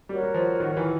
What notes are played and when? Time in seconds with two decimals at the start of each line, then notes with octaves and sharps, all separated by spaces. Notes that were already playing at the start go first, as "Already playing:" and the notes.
0.09 G3 F#4 A#4 C#5
0.23 G3
0.34 F3
0.60 D#3
0.77 E3